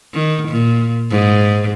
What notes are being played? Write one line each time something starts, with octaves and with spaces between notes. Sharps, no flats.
D#3
A#2
G#2